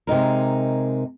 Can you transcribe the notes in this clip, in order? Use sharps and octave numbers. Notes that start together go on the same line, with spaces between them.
C3 G#3 D#4 A#4